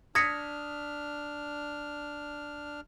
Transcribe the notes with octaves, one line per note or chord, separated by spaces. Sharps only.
D4 D#6 F6 G#6 A#6 B6 C#7